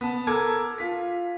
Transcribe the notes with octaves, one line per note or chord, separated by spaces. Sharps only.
B3 A5
A4 A#4 A5 D6 G#6
F4 B6